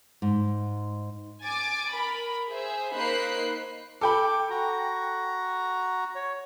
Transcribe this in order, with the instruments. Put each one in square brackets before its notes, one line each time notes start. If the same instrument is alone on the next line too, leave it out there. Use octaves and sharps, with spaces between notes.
[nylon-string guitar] G#2
[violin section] G#5 D6 A6
A#4 B5
G#4 C5 E5
A#3 D#4 C5 B5 F#6 C7
[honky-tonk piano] A4 G5 B5 [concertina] D6
[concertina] F#4 A#5
C#5